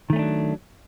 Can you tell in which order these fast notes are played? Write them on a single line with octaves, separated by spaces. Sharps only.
D#3 A3 C#4 D4 F#3